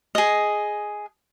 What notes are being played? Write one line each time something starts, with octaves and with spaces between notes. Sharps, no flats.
G#4 D#5